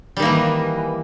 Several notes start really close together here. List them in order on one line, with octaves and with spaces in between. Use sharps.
G3 D#3 A#3 E3